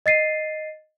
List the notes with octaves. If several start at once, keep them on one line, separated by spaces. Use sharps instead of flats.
D#5 A6 C7 D#7